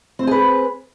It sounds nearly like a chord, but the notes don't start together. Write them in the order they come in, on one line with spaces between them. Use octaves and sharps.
C4 C5 G#4 B4